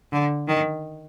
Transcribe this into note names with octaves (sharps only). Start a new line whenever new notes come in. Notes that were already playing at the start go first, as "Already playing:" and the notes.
D3
D#3